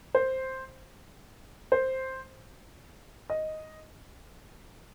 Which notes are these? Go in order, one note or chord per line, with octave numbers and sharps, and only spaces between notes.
C5
C5
D#5